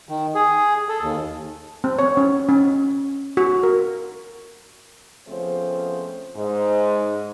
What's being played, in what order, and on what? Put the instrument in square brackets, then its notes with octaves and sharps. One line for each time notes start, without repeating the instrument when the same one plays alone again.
[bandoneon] D#3
G#4
A4
D#2
[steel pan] C4
C#5
C#4
C#4
F#4
A#4
[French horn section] C#3 F3 A3 B3 C4 C5
G#2